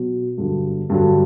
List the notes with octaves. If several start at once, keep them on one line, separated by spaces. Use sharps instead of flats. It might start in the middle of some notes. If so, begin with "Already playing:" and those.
Already playing: B2 F#3 B3
G2 D3 F#3
G2 D3 F#3